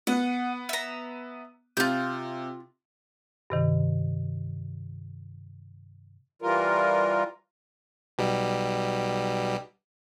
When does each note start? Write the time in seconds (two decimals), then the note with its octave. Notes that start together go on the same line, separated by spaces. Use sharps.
0.07 B3 F#5
0.69 E5 A#5
1.77 C3 F4 G6
3.50 G2 C3 D#3
6.42 E3 G3 F4 A#4
8.18 B1 B2 G3